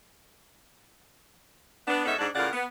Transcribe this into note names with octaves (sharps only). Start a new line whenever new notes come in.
B3 D4
G#2 B3 C#4 D#4 A4 E5
G#2 D4
A2 C#3 F4 A#4 D5 F#5
B3